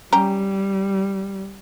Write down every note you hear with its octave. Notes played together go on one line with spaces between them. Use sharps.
G3 C#4 G4 A#5